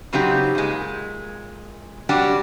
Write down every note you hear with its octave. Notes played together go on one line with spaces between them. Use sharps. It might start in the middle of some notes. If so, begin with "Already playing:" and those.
C#3 F#3 C4 D#4 G4
A#2 G#3
F#3 G3 D4 F#4 G4